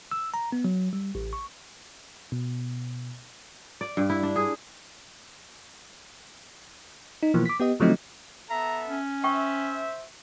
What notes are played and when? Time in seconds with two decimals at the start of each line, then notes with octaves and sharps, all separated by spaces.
0.11 E6
0.34 A#5
0.52 B3
0.65 F#3
0.93 G3
1.15 A1
1.33 C#6
2.32 B2
3.81 D5
3.97 G2
4.10 E4
4.23 D4
4.36 G#4
7.23 D#4
7.34 B2 E3 F3 A#3
7.45 D6 B6
7.60 B3 G4 D#5
7.80 D3 F3 F#3 A3 C4 D#4
8.50 B3 A4 E5 A#5
8.87 C#4
9.24 C5 E5 G5 C#6